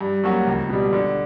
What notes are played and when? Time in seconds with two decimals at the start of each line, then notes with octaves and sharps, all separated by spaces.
0.01 G2
0.24 F#3 A#3 C#4 F#4
0.47 C#2
0.69 B2 G3
0.93 D3